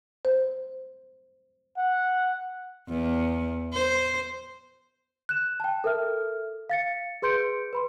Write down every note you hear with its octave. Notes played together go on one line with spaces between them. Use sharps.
C5
F#5
E2
C5
F#6 E7
G5 A5
A4 A#4 E5 F6
F5 A6 C#7
G#4 B4 C6 G6 C#7 D7
B4 B5 C6